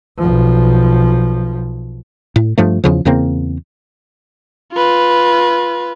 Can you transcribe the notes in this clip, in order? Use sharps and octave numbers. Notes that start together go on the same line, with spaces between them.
B1 F3
A2
G2 F3 A3
E2 C#3 F3
E2 C#3 A#3 C4
F4 B4